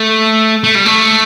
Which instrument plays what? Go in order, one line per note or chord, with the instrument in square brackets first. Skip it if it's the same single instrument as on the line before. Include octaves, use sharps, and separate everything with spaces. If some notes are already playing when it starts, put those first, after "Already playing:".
Already playing: [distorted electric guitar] A3
A3
G3
A3